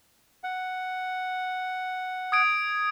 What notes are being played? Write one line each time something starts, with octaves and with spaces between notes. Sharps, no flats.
F#5
D#6 G#6 D7